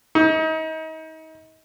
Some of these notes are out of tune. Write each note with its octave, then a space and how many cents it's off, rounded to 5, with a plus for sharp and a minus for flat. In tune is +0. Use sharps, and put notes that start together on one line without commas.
D#4 +35